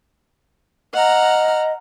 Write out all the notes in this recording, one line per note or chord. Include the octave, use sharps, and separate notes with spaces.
D#5 F#5 A#5 F6